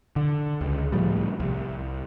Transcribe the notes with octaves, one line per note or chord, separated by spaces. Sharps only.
D3
C#2
A2 F3 G3
C2